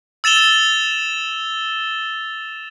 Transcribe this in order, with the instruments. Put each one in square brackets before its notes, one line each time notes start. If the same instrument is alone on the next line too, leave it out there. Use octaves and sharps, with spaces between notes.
[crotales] E6 A6 E7 F7 G7